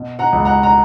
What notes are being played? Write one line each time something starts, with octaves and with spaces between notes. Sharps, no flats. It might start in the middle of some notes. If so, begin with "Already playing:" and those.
Already playing: B2
F#5 A#5
C#2
F#5 A#5
A#5